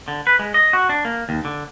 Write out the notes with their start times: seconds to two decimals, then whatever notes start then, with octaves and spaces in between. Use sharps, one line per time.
0.08 D3
0.27 B4
0.39 G#3
0.54 D#5
0.73 F#4
0.89 D4
1.05 A#3
1.29 D#2
1.45 D3